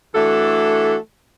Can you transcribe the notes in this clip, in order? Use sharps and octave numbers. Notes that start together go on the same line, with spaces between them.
E3 A3 D4 F#4 A4